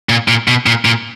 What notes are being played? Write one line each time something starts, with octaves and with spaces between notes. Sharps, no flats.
A#2
A#2
B2
A#2
A#2